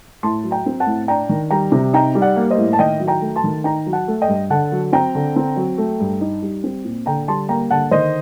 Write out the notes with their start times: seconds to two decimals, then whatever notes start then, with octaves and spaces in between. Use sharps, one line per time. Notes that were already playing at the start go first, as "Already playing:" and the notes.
0.23 A2 A5 C6
0.44 F#3
0.51 G5 A#5
0.66 C4
0.80 F#5 A5
0.86 A2
1.08 D4 G5 A#5
1.29 D#3
1.51 G3 G5 A#5
1.72 C3
1.93 D#4 G5 A#5
2.15 G3
2.22 D5 F#5
2.36 A#3
2.51 C5 D#5
2.58 A2
2.73 A5
2.79 D#3 D#5 G5
3.00 F#3
3.07 G5 A#5
3.21 A3
3.36 A5 C6
3.44 D#3
3.64 D#4 G5 A#5
3.86 F#3
3.93 F#5 A5
4.08 A3
4.22 D#5 G5
4.28 G2
4.50 D3 F#5 A5
4.72 F#3
4.93 C4 G5 A#5
5.15 D3
5.36 C4
5.56 F#3
5.78 A3
6.00 G2
6.21 D#4
6.42 G3
6.64 C4
6.85 A#2
7.06 D3 G5 A#5
7.28 G3 A5 C6
7.49 A#3 G5 A#5
7.71 D3 F#5 A5
7.91 D#3 C5 D#5